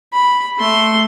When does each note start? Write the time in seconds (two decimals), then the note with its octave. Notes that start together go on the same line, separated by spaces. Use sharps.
0.13 B5
0.59 A3 C6